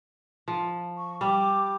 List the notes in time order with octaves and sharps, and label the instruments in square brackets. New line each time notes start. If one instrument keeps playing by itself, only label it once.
[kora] F3
[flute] C#6
[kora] G3 [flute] D6